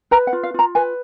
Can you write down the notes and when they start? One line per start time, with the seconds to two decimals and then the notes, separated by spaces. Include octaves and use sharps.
0.11 B4 A#5
0.27 F#5
0.33 F4
0.43 F5
0.54 F4 A#5
0.75 B4 G#5